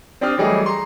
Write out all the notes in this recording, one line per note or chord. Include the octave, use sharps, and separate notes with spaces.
C4 D4 G4 D#6 F6
E3 F#3 G3 A3 G#4 D#5
A#5 C6